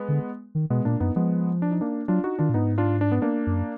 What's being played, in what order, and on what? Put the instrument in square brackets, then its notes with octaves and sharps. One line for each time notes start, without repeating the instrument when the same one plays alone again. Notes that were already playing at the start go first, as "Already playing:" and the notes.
Already playing: [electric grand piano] G#3 B3
[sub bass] D3
D#3
[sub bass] B2 [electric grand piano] G#3 B3
[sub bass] A#2 [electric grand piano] A#3 D4
[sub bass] F#2 [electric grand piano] B3 D#4
[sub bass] F3 [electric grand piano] G#3 B3
[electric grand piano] D4
D#4
A#3 D4
[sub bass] F#3 [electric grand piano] D4 F4
[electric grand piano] D#4 F#4
[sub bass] D#3 [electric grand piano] D4 F4
[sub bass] A#2
[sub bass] G#2 [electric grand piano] B3 D#4
[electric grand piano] D4 F4
D4
B3
A#3 D4
[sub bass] F#2